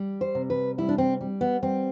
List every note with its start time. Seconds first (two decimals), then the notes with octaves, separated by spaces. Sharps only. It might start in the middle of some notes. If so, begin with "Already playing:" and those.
Already playing: G3
0.21 C5
0.35 C3
0.50 B4
0.78 G3 E4
0.89 D4
0.98 C4
1.21 G3
1.41 B3
1.62 G3 C4